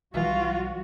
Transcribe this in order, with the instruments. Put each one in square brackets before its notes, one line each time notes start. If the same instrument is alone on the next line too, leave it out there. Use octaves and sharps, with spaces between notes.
[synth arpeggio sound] B1 E3 [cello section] G3 F#4 [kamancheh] F4